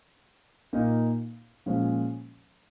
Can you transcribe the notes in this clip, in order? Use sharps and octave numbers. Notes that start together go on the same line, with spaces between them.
A#2 A#3 D#4
A#2 F3 G#3 C#4